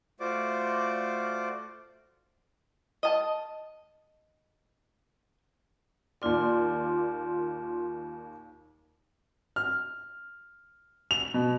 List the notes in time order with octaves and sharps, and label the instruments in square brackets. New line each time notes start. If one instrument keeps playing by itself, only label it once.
[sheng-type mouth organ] A3 F4 F#4 C5 D5 D6
[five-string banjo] D#5 A5
[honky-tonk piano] D#2 A#2 D5 [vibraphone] F4 C6
[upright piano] F6
F7
B2